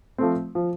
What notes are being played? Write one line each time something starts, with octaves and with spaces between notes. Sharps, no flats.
F3 A3 C4
F3